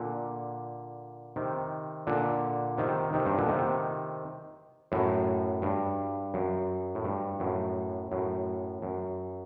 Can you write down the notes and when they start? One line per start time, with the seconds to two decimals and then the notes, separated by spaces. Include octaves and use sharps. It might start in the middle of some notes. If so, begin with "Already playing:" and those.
Already playing: A#2 D3
1.36 C3 D#3
2.07 A#2 D3
2.78 C3 D#3
3.13 C3 D#3
3.26 G2
3.37 A#2 D3
3.49 C3 D#3
4.92 F#2 A2
5.62 G2
6.34 F#2
6.95 A2
7.05 G2
7.40 F#2 A2
8.12 F#2 A2
8.82 F#2